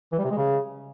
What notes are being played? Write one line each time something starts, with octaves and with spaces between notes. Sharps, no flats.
E3
G3
C3
G#3
C#3